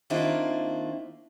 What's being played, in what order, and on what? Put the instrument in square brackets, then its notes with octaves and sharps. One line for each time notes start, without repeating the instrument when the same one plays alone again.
[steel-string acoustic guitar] D#3 A#3 C4 D4 E4 F4